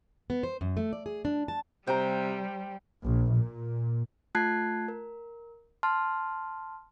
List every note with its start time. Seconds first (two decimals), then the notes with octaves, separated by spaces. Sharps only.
0.30 B3
0.43 C5
0.61 F#2
0.77 A3
0.93 D5
1.06 G#4
1.25 D4
1.48 A5
1.87 C3 G3 C5 G5 A#5
3.03 A#1
3.35 A#2
4.35 A3 F4 A5 F#6 G#6 C7
4.88 A#4
5.83 A5 C6 F6